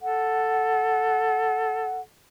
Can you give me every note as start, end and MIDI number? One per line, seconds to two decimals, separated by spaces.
0.01 2.04 69
0.01 2.00 78